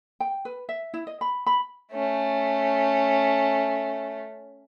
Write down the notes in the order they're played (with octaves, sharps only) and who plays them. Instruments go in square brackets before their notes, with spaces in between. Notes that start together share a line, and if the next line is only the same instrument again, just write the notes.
[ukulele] G5
B4
E5
E4
D#5
B5
B5
[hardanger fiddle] A3 C#4